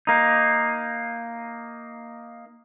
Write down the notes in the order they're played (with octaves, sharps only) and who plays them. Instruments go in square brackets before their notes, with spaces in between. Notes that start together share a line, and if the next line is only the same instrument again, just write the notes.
[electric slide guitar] A#3 D#4